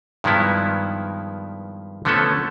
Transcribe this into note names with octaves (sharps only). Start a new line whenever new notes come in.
G2 D#3 F3 G#3 B3 E4
D3 F3 A3 B3 C#4 A4